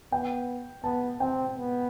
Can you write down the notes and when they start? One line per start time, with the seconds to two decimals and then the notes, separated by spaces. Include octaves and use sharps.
0.12 B3 G5
0.84 B3 A5
1.20 C4 G5
1.57 B3